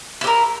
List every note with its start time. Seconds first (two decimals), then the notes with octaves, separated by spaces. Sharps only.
0.21 E4
0.24 G4
0.27 A#4